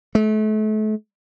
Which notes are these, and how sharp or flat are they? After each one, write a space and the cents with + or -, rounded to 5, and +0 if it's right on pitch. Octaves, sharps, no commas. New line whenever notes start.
A3 -35